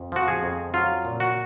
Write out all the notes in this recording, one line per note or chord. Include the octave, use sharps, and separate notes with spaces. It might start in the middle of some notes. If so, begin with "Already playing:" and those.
Already playing: F2
F3 F#4
G#4
F2
F#3 F4
A#2
F#4